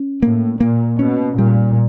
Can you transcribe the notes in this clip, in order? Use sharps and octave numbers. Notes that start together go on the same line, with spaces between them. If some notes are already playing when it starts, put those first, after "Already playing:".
Already playing: C#4
A2 A#3
A#2 A#3
B2 C#4
A#2 G3